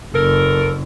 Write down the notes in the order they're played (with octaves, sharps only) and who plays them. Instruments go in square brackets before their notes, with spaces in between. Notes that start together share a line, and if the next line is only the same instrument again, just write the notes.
[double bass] F#1 [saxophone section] A4 A#4